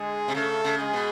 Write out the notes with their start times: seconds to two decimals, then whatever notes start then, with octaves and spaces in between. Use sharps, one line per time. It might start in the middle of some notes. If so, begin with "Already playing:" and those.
Already playing: D3 G#3 G#4
0.28 C3
0.35 C#3 A3 A4
0.64 C#3
0.79 G#3 G#4
0.93 B2